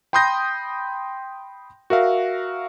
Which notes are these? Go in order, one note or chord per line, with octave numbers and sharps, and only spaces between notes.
G5 B5 C6 D#6 G6 A#6
F#4 A#4 E5 F5